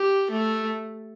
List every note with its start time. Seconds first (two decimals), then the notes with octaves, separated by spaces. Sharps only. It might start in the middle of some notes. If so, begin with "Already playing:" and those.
Already playing: G4
0.31 A3